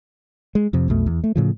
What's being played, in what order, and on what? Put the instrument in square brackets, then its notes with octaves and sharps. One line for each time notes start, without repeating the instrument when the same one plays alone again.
[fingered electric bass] G#3
F2 C3
B1 F2 B2 A3
E2
A3
A2 C#3 F3